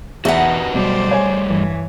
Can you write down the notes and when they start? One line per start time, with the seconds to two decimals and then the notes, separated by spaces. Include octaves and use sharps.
0.25 E2 D#4 F#4 G4 B4 E5 F#5 A5
0.74 B2 F#3 G3 A3 C5 D5
1.11 C#5 G#5
1.45 G2 E3